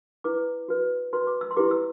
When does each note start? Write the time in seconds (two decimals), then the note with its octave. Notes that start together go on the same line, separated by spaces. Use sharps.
0.24 E4 B4 D6
0.68 F#4 B4
1.13 F#4 B4 C6
1.27 D6
1.41 E6
1.51 C6
1.56 E4 G4 B4 D6
1.71 E6